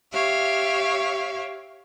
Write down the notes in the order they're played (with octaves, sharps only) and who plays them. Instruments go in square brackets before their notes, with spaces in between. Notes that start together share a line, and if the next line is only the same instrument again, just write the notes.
[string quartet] G4 C#5 E5 F5